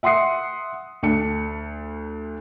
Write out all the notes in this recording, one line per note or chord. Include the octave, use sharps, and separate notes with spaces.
E5 F#5 C6 D#6 C7 C#7
D2 D4 C#7